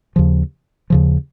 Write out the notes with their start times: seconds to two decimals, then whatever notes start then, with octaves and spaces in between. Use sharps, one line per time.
0.16 D#2 C#3 F3
0.90 D#2 C#3 F3